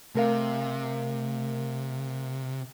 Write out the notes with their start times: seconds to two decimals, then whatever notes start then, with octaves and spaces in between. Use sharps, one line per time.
0.15 C3 A3 A#4 F5